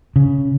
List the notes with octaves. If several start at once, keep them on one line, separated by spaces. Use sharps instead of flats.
C#3